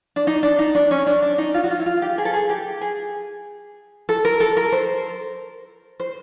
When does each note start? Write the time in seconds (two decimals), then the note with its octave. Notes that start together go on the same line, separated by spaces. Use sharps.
0.16 D4
0.27 D#4
0.43 D4
0.59 D#4
0.75 D4
0.91 C#4
1.06 D4
1.22 D4
1.38 D#4
1.54 F4
1.64 F#4
1.71 F4
1.80 E4
1.86 F4
2.02 G4
2.18 G#4
2.25 A4
2.33 G#4
2.49 G4
2.81 G#4
4.09 A4
4.25 A#4
4.40 A4
4.57 A#4
4.72 C5
6.00 C5